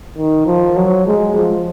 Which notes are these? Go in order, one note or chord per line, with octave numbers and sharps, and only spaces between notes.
D#3
F3
F#3
G#3
F3